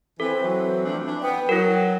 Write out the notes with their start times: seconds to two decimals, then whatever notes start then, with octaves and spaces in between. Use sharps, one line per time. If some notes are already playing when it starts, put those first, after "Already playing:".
0.20 E3 C4 A4
0.41 E3 F#3
0.85 F3 A3 D4
1.06 E3 D4
1.22 B3 G5
1.49 F#3 E4 A#4